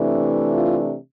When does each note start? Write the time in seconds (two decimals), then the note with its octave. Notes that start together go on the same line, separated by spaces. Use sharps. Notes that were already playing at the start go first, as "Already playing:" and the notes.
Already playing: C3 E3 A3 D4
0.53 F4